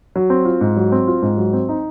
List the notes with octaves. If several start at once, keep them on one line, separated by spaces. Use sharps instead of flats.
F#3
C4
F4
G#2
F#3
C4
F4
G#2
F#3
C4
D#4